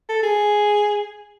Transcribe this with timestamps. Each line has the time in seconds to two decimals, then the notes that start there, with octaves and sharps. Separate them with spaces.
0.09 A4
0.23 G#4